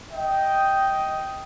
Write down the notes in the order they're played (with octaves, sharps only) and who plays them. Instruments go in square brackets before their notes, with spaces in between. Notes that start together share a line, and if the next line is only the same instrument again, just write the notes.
[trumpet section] D#5 G5